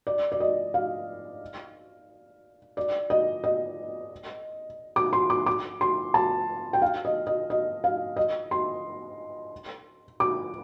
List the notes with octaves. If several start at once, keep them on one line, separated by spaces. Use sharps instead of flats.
D5
D5
D#5
F5
D5
D#5
D#5
D6
C6
D6
D6
C6
A5
G5
F5
D#5
D#5
D#5
F5
D#5
C6
D6